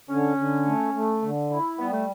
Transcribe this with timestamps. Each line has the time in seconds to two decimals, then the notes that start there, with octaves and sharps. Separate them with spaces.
0.09 D3 C#4
0.37 D3
0.66 A3
0.94 A3
1.22 D3
1.50 E4
1.79 G3 B3
1.92 A3